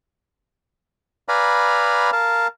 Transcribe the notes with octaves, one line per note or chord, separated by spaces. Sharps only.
B4 D5 F5 G#5 A#5 B5
A#4 F5 A5